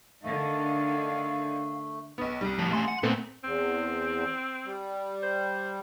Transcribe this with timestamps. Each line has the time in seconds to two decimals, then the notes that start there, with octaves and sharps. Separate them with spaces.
0.23 D3 D#3 A3 F5
2.18 B1 B3
2.41 C2 G3
2.58 A2 F3
2.73 A3 C#4 G#5 C6
2.88 F#5
3.03 A#2 A3 B3 C4
3.44 E2 C4
4.66 G3
5.23 C5